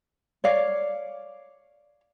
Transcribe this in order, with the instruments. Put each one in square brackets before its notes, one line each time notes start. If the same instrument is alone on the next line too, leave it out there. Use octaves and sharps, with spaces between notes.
[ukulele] C#5 D5 F5